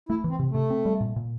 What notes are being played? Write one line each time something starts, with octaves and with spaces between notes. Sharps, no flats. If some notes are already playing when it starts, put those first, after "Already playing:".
A3 E4
E3
C4
C3
C3 A3
C4
G3
A#2
A#2